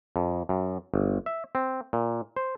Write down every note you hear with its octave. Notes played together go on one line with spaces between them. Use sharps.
F2
F#2
G1
E5
C4
A#2
C5